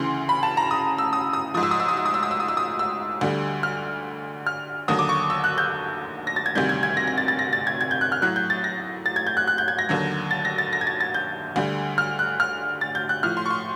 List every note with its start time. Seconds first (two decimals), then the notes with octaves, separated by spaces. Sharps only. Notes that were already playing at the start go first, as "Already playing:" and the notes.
Already playing: D2 C#3 E3 C6
0.29 B5
0.43 A5
0.57 A#5
0.71 D#6
0.98 E6
1.13 D#6
1.33 D#6
1.54 G#2 F3 D#6
1.63 E6
1.71 D#6
1.80 E6
1.88 D#6
1.97 E6
2.05 D#6
2.14 E6
2.23 D#6
2.31 E6
2.40 D#6
2.48 E6
2.57 D#6
2.79 E6
3.21 D2 D3 G3
3.63 F6
4.47 F6
4.88 D#2 D3 F#3 D#6
4.99 D6
5.09 C#6
5.30 E6
5.44 F#6
5.58 G6
6.27 A#6
6.36 A6
6.46 G#6
6.55 D2 C3 D#3 G3 G6
6.69 G#6
6.83 G#6
6.97 A#6
7.07 A#6
7.18 A6
7.28 A6
7.39 A#6
7.53 A6
7.67 G#6
7.81 G#6
7.91 G6
8.01 F#6
8.12 F6
8.22 A2 F#3 F#6
8.36 G6
8.50 A6
8.64 A#6
9.06 A6
9.16 G#6
9.27 G6
9.37 F#6
9.47 F#6
9.58 G6
9.68 G#6
9.79 A#6
9.89 D#2 D3 F#3
10.31 A6
10.45 A#6
10.58 A6
10.73 A#6
10.81 G#6
10.87 A6
11.01 A6
11.14 G6
11.56 D2 D3 G3
11.98 F6
12.19 F#6
12.40 F6
12.81 A6
12.95 G6
13.09 F#6
13.23 A2 F3 F6
13.37 C6
13.46 C#6
13.50 C6